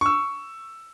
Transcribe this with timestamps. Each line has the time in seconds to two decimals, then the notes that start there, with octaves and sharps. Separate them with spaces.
0.01 C#6 E6